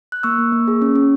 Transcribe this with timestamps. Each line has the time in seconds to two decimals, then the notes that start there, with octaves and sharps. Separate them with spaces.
0.12 F#6
0.23 A#3 C#6 E6
0.38 A#3
0.53 A#3
0.68 G#4
0.82 C#4
0.95 C#4